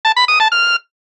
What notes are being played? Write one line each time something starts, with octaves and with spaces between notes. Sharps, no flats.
A5
B5
D#6
A5
F6